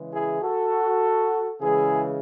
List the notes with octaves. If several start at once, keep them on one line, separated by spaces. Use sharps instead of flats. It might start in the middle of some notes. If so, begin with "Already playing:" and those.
Already playing: C#3 E3 G#3
E4 G#4
F#4 A4
C#3 E3 G#3 E4 G#4